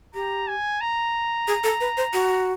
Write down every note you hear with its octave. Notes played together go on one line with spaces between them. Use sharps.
G4 A#5
G#5
A#5
G#4
A4
B4
C5
F#4